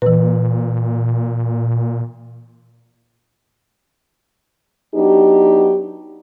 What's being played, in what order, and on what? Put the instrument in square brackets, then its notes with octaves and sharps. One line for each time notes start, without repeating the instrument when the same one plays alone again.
[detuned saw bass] A#2 [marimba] E3 B4
[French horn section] F#3 B3 D4 D#4 G4